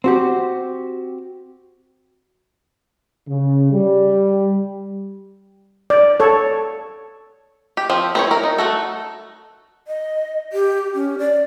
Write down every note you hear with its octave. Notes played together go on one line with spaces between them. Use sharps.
C4 F#4 G4
C#3
G3
D5
A4 C#5
G4
F3 C4
C4 B4 C#5
E4 A#4
D#4
A3 F#4 A4
D#5
G4
C#4
D5